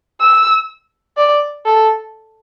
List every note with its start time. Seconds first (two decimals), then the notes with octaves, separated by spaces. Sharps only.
0.21 E6
1.17 D5
1.65 A4